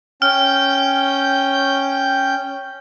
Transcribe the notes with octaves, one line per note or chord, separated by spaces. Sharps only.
C#4 G5 F6 G6